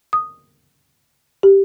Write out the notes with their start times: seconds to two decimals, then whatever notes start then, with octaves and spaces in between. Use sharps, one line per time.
0.13 D#6
1.43 G4